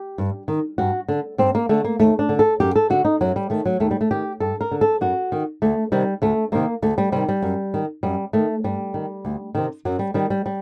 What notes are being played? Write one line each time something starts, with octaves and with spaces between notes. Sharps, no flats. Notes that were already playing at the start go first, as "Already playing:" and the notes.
Already playing: G4
G2
D#3
G2 F#4
D3
G2 C4
A#3
D3 A3
A#3
D#2 A3
D4
D3
A4
F#2 G4
A4
D3 F#4
D#4
F#2 F#3
G3
D#3 A3
F#3
D#2 A3
G3
A3
D#3 G4
G2 A4
A#4
D3
A4
F#2 F#4
D#3
D2 A3
C3 D#3 G3
D2 A3
C3 D#3 A#3
D2 A3
G3
C3 D#3 G3
G3
F#2
D#3
F#2 G3
D#3 A3
G2 G3
D#3
D2
C3 D#3
F#2 F#3
G3
D#3 G3
G3
G3